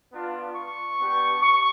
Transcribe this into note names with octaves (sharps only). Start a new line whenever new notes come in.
B3 D4 F4
C#6
B3 D4 G4
C#6